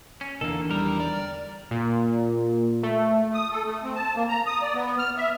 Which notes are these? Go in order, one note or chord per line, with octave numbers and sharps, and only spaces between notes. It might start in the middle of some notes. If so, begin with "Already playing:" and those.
C#4
E2 D3 D#3 A#3 A4
G3 A#4
D5
A#2
A3
D#6
A4
A3
C4
A5
A#3
A#5
D#6
D5
B3
F6
E5